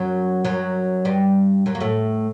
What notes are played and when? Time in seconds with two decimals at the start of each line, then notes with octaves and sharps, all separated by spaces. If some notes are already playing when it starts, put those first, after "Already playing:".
Already playing: F#2 F#3
0.45 F#2 F#3
1.05 G2 G3
1.66 F#2 F#3
1.75 A#3
1.80 A2 A3